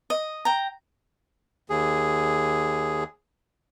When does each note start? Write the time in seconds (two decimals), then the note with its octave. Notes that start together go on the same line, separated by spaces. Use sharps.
0.10 D#5
0.45 G5 A#5
1.70 D#2 G#4